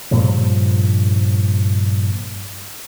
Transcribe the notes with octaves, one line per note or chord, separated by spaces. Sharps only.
G2 A#2 C#3 F3